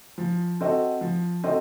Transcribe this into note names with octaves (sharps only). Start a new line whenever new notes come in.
F3
C4 F#4 A4 D#5
F3
C4 F#4 A4 D#5